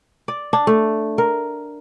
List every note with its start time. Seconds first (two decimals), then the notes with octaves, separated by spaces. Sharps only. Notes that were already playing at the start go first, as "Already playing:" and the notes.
0.28 D5
0.53 D4
0.67 A3
1.18 A#4